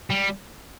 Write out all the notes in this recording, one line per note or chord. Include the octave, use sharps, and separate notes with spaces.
G3